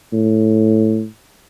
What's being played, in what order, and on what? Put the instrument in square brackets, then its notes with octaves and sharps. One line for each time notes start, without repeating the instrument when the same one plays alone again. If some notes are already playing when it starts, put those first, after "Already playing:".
[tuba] A2